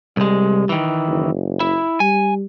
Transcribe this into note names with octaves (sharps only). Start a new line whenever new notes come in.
C2 G3 G#3
D#3 E3
F#1
E4
G3 G#5